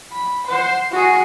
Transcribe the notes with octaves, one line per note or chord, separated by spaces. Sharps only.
B5
C5 F#5
F#4 G#4